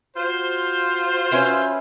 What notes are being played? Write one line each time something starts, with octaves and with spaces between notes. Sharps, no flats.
F4 F#4 C5
C#4 E4 B4